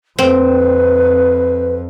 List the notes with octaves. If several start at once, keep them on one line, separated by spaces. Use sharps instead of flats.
F2 C4 B4